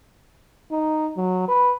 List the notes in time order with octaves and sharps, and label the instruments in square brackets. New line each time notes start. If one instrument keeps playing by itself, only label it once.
[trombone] D#4
F#3
B4